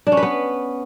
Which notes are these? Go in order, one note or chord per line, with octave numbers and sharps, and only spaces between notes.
D4
C#4
B4
B3